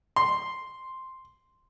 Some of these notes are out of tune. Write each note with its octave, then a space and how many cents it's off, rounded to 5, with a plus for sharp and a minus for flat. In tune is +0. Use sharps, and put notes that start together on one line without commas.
C6 +0